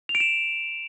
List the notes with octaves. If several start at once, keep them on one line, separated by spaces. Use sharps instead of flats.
F7
D7
E7